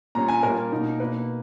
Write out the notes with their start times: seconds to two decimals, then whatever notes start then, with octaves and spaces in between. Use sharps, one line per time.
0.15 A#2 G3 C#4 A#5
0.28 G#5
0.43 A#2 G3 A#3 C#4 A#4
0.72 B2 A#3 D#4
1.00 B2 A#3 D#4 B4